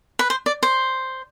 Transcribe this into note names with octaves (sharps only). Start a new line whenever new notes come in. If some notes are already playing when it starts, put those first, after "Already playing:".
B4
C5
D5
C5